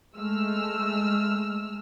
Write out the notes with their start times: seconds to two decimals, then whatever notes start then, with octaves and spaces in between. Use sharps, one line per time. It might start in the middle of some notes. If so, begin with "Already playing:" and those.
0.16 G#3 A3 E6 F6